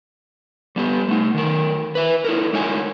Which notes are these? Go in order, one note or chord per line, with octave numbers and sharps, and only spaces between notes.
G3 B3 G4
A3 D#4
D#3 F#3 A#4
B4 E5
E4 A4 A#4
G#3 D#4 A#4 C#5 G#5